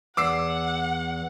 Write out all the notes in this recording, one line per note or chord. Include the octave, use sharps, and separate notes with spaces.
E2 F#5 D6 E6 C7